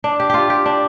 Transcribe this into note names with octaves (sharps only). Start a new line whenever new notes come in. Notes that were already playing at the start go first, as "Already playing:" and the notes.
D4
G4
F4 G4
G4
D4